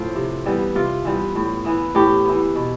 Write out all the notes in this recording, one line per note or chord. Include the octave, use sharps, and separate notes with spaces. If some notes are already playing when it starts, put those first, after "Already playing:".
Already playing: A2 F3 C4
C3
E3 G3 B3
C3 F4
E3 G3 B3
A2
E3 B3
A2 G4
E3 B3
B2